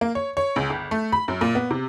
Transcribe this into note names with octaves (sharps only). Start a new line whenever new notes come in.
A#3
C#5
C#5
C#2
G1
A3
B5
F#2
A#2
B3
C3